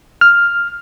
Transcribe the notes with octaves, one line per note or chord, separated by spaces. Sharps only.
F6